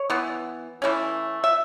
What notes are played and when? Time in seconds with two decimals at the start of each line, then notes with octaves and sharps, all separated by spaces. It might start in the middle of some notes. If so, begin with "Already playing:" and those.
Already playing: C#5
0.10 E3 B3
0.82 E3 A3 C#4
1.44 E5